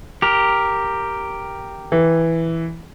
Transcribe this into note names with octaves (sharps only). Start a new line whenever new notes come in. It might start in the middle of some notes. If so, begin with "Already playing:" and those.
G4 A#4
E3